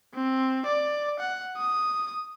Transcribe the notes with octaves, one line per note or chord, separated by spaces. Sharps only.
C4
D5
F#5
D#6